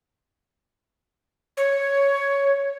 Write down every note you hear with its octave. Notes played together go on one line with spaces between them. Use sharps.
C#5